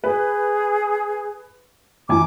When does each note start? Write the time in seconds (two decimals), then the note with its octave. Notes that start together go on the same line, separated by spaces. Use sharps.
0.04 G#4 B4
2.09 F#2 E3 G#5 D6